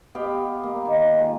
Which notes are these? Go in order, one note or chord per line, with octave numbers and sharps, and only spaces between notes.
B3 G4 F5 G5
A#3
D#3
G#3 F4